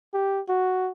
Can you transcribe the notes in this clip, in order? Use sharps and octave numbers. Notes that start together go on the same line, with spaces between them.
G4
F#4